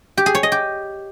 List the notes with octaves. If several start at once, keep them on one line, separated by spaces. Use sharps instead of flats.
G4
G#4
C#5
D#5
G4